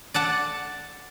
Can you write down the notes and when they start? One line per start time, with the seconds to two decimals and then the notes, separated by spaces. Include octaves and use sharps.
0.14 D5 F#5 A5